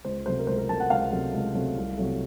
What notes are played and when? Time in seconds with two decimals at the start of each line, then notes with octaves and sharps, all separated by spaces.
0.05 C#2 C5
0.26 C3 F#3 A3 C5
0.39 A#4
0.47 C#2 C5
0.58 A#4
0.69 C3 F#3 A3 A5
0.80 F#5
0.90 C#2 F5
1.12 C3 F#3 A3
1.33 C#2
1.54 C3 F#3 A3
1.77 C2
1.97 C3 F#3 A3